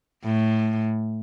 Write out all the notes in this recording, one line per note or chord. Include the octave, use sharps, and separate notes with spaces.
A2